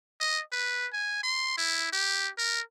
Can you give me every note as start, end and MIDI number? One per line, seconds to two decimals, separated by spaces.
0.20 0.41 75
0.52 0.87 71
0.93 1.18 80
1.23 1.56 84
1.57 1.89 64
1.92 2.29 67
2.38 2.61 70